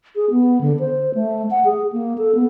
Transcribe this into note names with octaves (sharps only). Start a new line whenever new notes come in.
G#4
B3
D3
C5
A3
F#5
G#4
A#3
A4
B3